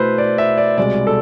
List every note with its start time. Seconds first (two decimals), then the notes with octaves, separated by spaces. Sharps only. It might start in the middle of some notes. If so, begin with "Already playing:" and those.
Already playing: B2 A3 E4 B4 C5
0.18 D5
0.38 E5
0.57 D5
0.78 C2 B2 G#3 D5
1.07 A4